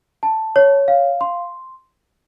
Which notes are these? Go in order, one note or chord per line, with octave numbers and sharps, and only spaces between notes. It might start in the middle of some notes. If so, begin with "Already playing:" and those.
A5
C#5
F5
C6